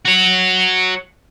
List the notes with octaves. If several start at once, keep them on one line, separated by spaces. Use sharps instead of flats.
F#4 C#5